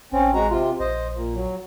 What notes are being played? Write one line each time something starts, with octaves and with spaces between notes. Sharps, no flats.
A1 C4 C#4
G#3 F#4 A#5
C3 F4
A#1 C5 D#5
A#2
F#3